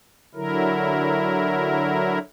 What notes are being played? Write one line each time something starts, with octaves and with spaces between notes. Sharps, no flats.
D3 F#3 E4 A#4